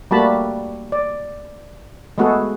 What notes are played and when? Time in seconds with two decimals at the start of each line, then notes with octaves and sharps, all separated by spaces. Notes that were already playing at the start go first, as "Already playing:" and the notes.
0.11 G3 A3 A#3 F#4 A5 B5
0.92 D5
2.18 G#3 A3 B3 F#4 G#4 A4